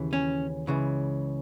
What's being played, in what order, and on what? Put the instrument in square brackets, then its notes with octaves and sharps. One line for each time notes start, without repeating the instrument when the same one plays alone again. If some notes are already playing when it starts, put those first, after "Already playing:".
Already playing: [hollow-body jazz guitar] D#2 C#3 E3
C#4
C#2 C#3 E3